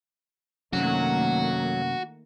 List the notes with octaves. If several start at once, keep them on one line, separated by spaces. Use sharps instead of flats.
F#2 C3 D#3 F#3 A3 A#3 C#4 F#4